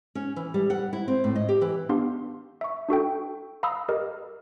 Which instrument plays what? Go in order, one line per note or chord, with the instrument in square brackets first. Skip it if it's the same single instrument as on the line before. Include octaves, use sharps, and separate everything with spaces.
[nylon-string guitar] C#4
E3
G3
F#5
E4
C4
A2
D#5
G4
E3
[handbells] B3 D4 G4 F5 C6
E5 C#6
D4 F#4 A4 G5
F5 A#5 B5 D#6 E6
G4 A#4 D#5